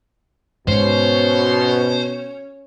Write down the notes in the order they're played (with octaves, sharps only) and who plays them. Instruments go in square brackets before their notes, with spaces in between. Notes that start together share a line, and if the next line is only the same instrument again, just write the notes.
[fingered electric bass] G#2 [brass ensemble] B2 [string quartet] C#4 C#5 [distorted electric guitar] C5